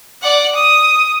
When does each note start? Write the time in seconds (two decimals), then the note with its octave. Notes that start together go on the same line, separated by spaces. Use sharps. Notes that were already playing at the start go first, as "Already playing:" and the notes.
0.22 D5 F#5
0.55 D#6